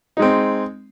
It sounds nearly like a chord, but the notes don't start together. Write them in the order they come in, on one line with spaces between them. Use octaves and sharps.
D#4 G#3 C4